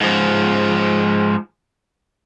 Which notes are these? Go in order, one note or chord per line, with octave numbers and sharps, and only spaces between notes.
G#2 F3